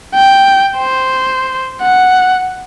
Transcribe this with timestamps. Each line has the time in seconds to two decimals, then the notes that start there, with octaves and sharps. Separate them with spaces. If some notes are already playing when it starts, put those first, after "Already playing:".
0.15 G5
0.77 C5
1.82 F#5